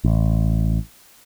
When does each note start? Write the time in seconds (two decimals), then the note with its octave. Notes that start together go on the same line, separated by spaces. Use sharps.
0.04 A1